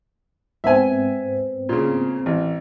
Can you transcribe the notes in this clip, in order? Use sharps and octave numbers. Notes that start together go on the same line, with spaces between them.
G#2 B3 C4 E5 G#5
A#2 C#3
A1